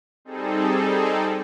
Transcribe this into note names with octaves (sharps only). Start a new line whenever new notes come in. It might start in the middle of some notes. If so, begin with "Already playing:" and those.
G3 C4 D#4 G#4 A4